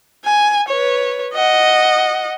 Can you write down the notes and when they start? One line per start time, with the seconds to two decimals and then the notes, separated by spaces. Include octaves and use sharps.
0.25 G#5
0.68 B4 C#5
1.34 D#5 F#5